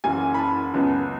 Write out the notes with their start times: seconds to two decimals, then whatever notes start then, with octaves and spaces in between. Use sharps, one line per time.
0.04 F#1 F#2 E3 G#5
0.34 B5
0.39 A5
0.74 C#2 C#3 F#3 B3